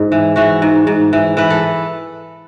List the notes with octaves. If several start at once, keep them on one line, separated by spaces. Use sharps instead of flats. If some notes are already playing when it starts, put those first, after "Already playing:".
Already playing: G#2
E3
E3 F#4
G#2
G#2
E3
E3 B4
A4